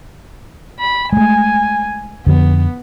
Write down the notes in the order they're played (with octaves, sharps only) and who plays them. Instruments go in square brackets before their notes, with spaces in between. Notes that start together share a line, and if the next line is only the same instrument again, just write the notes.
[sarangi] B5
[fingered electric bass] G#3 A3 [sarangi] G#5
[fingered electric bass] F2 D3 [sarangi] B3